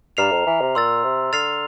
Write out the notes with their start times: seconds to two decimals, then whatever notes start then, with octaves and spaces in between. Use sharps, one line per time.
0.17 G2 A#5 F6 C7 F7
0.31 F2
0.46 E3
0.61 C3
0.75 A#2 C6 E6 A6
1.04 C3
1.33 D3 F6 A6 C7 F7